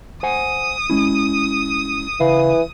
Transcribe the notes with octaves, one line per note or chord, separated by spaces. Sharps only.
C5 F#5 G#5 D#6
G#3 C#4 E4
C#3 E3 F5 B5